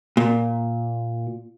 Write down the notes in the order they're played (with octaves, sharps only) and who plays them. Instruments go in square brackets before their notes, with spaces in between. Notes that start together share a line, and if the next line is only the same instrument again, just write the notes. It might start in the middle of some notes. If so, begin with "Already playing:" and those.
[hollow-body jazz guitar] A#2